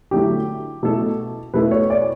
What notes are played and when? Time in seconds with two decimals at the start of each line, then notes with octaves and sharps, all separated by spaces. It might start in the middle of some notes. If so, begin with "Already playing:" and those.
0.11 D3 F#3 A3 E4 G4
0.83 B2 A3 E4 A4
1.54 B2 A3 E4 A4 B4
1.71 C#5
1.90 D5